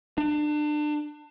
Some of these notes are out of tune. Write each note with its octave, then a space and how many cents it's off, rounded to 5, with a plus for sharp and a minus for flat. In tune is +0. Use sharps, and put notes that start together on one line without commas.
D4 +30